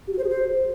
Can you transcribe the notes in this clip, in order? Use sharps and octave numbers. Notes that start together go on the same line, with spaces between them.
G4
F#4
C5
G#4
C5